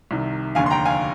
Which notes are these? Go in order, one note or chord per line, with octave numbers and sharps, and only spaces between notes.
C2 C3 D#3
F1 D#2 D3 F5 G#5
C6
G5 A#5
F5 G#5